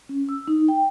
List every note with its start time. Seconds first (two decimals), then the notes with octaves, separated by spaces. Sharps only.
0.09 C#4
0.29 E6
0.48 D#4
0.68 G5